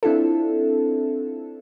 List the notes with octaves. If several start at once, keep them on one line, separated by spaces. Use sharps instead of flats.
C4 D4 E4 F4 A4